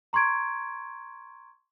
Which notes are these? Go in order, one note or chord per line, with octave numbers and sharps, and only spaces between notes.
A#5 C6 C#6 G#6 D7